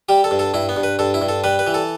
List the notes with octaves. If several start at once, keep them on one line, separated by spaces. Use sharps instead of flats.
G3 G4
A4
G2
A4
G2 E4
B3
G2
B4
G2 A4
E4
G2
A4
G3 B4
B4
E3
A4